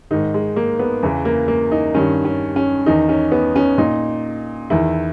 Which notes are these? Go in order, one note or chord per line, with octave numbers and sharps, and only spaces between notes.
G#2 D#3 D#4
G#3
A#3
B3
E2 C#3 E3
A#3
A#3
D#4
G2 D#3 C#4
C#4
C#4
E2 D#3 D#4
C#4
B3
C#4
A#2 D#4
E2 D#3 E4